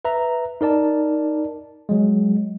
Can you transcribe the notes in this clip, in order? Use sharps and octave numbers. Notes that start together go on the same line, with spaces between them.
B4 E5 A#5
D#4 A#4 D5 A5
F#3 G#3